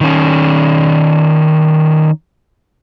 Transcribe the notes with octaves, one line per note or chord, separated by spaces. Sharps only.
D#3 C#4